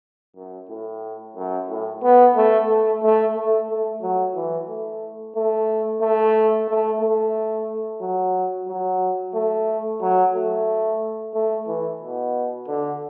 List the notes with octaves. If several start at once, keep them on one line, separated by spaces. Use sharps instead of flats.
F#2
A2
F#2
A2
B3
A3
A3
A3
A3
A3
F#3
E3
A3
A3
A3
A3
A3
F#3
F#3
A3
F#3
A3
A3
E3
B2
D3